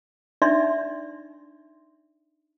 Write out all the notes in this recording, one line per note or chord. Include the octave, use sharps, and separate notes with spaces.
D4 D#4 D5 E5 C6